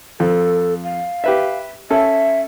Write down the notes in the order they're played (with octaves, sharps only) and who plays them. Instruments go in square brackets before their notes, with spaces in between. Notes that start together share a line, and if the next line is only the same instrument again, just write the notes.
[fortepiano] F2 [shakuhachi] A4
[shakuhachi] F5
[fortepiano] G4 B4 E5
[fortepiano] C#4 A4 [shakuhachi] E5